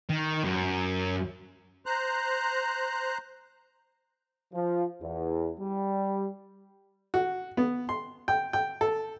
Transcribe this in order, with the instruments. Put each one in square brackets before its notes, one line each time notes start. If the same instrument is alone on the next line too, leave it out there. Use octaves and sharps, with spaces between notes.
[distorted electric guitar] D#3
F#2
[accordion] C5 A#5 F#6
[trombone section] F3
E2
G3
[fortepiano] F#4
B3
C6
G5
G5
A4